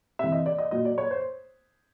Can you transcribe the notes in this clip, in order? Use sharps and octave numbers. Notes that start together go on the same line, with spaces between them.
C3 E3 E5
D#5
D5
D#5
A#2 F#3 D#5
D5
C#5
C5